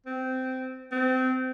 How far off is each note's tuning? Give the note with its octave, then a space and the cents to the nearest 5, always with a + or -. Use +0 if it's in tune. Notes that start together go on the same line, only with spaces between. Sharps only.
C4 -15
C4 -25